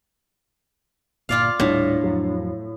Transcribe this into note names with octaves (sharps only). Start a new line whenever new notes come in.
G1 A#2 F4 D5 F5
D#1 A2 G3 D4
F2 F#3